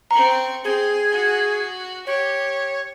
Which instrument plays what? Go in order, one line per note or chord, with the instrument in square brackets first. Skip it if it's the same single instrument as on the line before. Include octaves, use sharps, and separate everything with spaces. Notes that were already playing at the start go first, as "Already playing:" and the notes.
[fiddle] C4 C#6 [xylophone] A#5
[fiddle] C4 [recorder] G#4
[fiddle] F#4
[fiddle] G4 [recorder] C#5